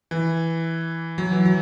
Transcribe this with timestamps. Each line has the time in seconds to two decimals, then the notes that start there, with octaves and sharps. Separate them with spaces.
0.11 E3
1.18 F#3
1.32 E3
1.45 F#3